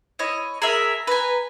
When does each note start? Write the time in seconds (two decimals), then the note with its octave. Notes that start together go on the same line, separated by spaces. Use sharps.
0.19 E4 C#5 D#5
0.62 G#4 A#4 E5 A#5
1.07 B4 G#5